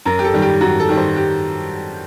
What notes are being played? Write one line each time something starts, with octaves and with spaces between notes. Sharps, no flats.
F#2 A#4
G4
A4
D#3 G3
G4
F#2 F#4
A4
D#3 G3
C5
G4